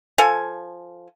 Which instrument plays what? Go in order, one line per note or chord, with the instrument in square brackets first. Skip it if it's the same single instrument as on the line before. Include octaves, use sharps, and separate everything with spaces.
[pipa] F3 A4 F5 G#5